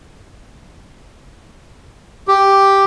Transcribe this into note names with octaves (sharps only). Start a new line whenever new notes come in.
G4